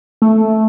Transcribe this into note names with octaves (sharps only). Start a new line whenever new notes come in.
A3